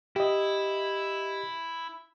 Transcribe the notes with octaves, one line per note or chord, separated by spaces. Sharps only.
E4 G4 D#5